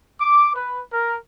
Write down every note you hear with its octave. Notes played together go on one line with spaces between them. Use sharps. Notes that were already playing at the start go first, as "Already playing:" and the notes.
D6
B4
A#4